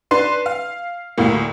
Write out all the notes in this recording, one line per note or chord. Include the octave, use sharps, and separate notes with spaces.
D4 B4 C6 C7
F5
D2 A2 A#3